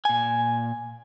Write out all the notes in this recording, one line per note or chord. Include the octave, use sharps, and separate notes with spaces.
A#2 G#5